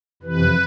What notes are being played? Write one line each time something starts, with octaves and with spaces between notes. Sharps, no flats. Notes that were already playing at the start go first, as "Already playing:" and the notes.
F2 C3 E3 B4